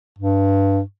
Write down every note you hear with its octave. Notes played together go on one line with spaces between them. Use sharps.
G2